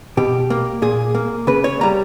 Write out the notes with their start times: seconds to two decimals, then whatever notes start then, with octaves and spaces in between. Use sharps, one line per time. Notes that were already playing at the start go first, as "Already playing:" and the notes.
0.17 B2 G4
0.50 A#3
0.82 A#2 G#4
1.15 A#3
1.47 C#3 B4
1.64 C#5
1.81 G3 A#3 A#5